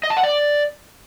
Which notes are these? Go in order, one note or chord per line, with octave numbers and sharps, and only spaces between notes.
D#5
A5
F#5
D5